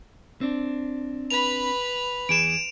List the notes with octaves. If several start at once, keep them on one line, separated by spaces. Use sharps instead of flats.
C4 D4
B4 B5 F7
E2 G#4 D7 E7